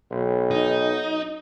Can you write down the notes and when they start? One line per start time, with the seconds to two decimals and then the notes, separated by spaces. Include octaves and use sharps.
0.11 B1
0.51 D#4